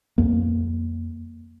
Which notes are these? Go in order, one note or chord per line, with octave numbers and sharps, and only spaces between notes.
F2 A#3